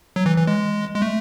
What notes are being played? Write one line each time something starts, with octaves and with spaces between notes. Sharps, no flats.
F#3
E3
E3
G#3
G#3
A3